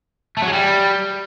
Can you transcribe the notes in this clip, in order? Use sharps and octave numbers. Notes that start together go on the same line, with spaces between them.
A3
F#3
G#3
G3